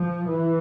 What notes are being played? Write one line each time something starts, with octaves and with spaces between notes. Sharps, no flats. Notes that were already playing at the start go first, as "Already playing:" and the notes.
Already playing: F3
E3